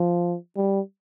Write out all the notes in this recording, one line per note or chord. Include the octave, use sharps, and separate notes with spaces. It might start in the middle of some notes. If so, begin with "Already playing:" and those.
Already playing: F3
G3